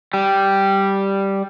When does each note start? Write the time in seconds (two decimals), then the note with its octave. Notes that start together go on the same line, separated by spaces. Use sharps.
0.14 G3